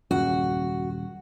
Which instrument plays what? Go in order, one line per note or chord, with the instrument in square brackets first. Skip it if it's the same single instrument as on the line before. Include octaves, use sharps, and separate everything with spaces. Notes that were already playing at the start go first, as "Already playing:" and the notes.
[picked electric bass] D#1 F#2 C#3 [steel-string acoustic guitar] F#4